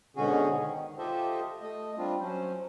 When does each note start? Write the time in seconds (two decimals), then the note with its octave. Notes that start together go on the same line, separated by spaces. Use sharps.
0.16 G#2 B2 D3 C#4 F#4 G#4
0.56 D#3
0.98 F4 G4 A4 C5 D#5 E5
1.62 A3 D#5
1.98 G3 C4 D4 F4
2.20 F#3 C#4 C5